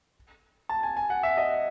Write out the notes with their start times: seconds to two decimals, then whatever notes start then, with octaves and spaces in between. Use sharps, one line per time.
0.69 A5
0.83 G#5
0.97 G#5
1.10 F#5
1.23 E5
1.37 D#5